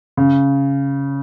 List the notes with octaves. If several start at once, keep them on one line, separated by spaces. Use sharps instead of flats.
C#3